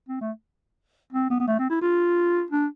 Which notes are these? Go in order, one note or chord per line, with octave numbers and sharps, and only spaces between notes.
C4
A3
C4
B3
B3
A3
C4
E4
F4
D4